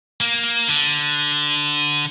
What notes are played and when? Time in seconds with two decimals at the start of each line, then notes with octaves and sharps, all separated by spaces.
0.21 A#3
0.68 D3